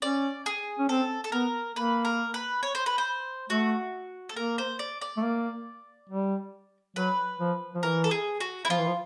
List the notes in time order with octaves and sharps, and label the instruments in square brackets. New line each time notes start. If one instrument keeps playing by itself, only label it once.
[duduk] C#4 [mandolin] D5
[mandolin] G#4
[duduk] C#4
[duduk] C4 [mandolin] A4
[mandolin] A4
[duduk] B3 [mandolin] A#4
[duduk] A#3 [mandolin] B4
[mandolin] A#4
B4
C#5
C5
B4
C5
[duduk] A3 [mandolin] F#4
[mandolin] A4
[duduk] A#3 [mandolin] A#4
[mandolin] C5
D5
D5
[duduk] A3
A#3
G3
[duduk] F#3 [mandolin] B4
[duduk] F3
F3
[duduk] E3 [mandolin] A#4
[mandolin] A4
G#4
F#4
E4
[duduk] F3 [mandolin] F4
[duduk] E3
F3